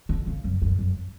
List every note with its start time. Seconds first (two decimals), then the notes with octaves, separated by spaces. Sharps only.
0.09 D3
0.27 C#3
0.44 F#2
0.62 F#2
0.79 F#2